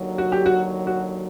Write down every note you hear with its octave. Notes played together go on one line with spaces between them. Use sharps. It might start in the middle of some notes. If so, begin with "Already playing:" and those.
Already playing: D#2 D3 F#3
F#4
G4
F#4
F#4